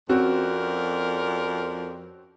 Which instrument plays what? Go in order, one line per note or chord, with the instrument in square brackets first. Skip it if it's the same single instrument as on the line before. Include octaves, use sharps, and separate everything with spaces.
[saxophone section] F2 A#4 D5 [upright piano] C4 C#4 F#4